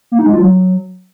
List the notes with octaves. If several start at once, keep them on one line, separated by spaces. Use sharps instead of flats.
A#3
D#4
G#3
F4
F#3